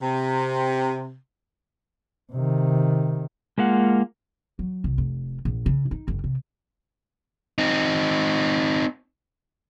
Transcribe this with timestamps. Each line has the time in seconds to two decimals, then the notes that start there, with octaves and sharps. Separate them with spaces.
0.02 C3
2.32 C3 D#3
3.58 G#3 A#3 F4 F#5
4.59 F#3
4.84 C2
4.98 F1
5.45 A#1
5.66 C#3
5.91 D#4
6.08 F#1
6.24 C3
7.58 C4 D#4